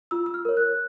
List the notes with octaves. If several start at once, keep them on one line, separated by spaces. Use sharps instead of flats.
F4 E6
E6
F6
A#4 C#5
F#6